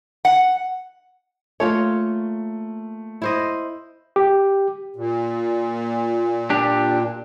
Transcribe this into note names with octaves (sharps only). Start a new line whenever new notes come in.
F#5
A3 A#3 F4 C#5
E4 C5 D#5
G4
A#2
D4 G4